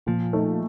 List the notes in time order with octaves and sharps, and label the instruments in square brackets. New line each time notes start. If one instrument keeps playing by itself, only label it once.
[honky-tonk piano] A#2 [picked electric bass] F3
[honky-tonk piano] A3 D#4